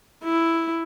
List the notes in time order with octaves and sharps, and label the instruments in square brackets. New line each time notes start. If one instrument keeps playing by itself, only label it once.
[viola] E4